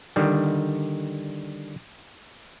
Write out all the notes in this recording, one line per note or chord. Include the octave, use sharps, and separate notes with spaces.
D3 D#3 G3